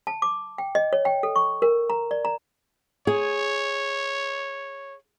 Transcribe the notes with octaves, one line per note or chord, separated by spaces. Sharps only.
A5
D6
G5
D#5
C#5
G5
A4
C#6
A#4
A#5
D5
A#5
G#4 C#5